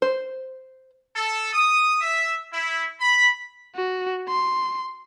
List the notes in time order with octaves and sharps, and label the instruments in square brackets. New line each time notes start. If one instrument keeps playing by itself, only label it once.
[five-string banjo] C5
[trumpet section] A4
D#6
E5
E4
B5
[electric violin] F#4
C6